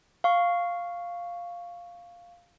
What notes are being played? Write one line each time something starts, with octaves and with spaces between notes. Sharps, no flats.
F5 C#6